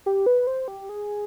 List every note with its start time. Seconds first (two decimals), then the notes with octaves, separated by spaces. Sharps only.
0.06 G4
0.26 B4
0.47 C5
0.68 G4
0.89 G#4